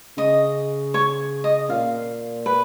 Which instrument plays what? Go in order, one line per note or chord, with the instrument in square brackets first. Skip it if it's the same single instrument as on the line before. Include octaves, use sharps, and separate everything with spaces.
[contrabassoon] C#3 [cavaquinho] D#5
[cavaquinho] C#5
D#5
[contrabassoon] A#2 [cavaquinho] F5
[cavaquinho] B4